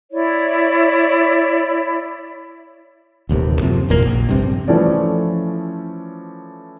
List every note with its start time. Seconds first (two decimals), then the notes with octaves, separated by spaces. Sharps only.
0.12 E4 C#5 D5
3.29 D#1 A1 D#2 C3
3.61 F#2 C3 F3
3.89 F#1 E2 A#2 A#3
4.05 A#1
4.29 G2 C3 C4
4.68 E3 F3 A3 C#4 D5